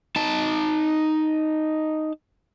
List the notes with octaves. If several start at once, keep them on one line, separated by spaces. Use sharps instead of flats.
D#4 A5